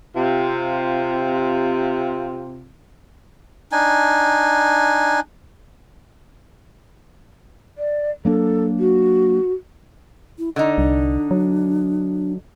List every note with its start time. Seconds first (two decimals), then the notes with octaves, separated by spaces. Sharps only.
0.16 C3 F4
3.72 D4 D#4 G#5
7.78 D5
8.25 F#3 A#3 D4 A4
8.79 F#4
10.39 E4
10.56 D3 D#4 D#5
10.78 C2 D4
11.31 F#3